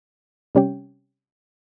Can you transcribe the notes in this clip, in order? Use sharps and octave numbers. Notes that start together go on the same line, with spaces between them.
C3 G3 C#4 G4